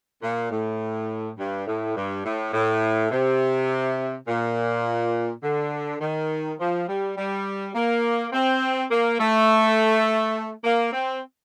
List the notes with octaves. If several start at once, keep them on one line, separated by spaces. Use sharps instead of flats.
A#2
A2
G2
A2
G2
A2
A2
C3
A#2
D3
D#3
F3
G3
G3
A#3
C4
A#3
A3
A#3
C4